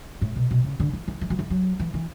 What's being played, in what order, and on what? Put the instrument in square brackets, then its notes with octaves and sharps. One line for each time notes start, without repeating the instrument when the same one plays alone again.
[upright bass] A2
B2
B2
C#3
D3
E3
E3
E3
F#3
E3
F#3
E3
E3